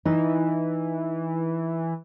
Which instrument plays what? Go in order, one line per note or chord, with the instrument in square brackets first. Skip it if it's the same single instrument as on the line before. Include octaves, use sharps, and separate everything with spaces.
[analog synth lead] E3 [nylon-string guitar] D#4